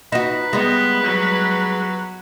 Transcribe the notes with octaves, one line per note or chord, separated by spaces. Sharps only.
D#4 F#4 B4
G3 G#3 B3
F#3